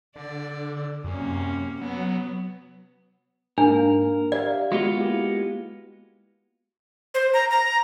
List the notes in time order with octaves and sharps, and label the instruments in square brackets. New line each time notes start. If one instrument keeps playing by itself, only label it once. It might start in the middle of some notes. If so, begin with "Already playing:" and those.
[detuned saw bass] D3 [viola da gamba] D5
[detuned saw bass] F#2 [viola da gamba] C3 A#3 C#4
[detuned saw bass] F#3 [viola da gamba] B3
[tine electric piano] G#2 A#3 [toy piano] D4 [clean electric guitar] A#4
[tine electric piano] G4 E5 F5 [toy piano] D5
[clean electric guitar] G#3 B3 F4 [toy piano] F#4
[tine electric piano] A#3 E4 G4
[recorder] C5
A#5
A#5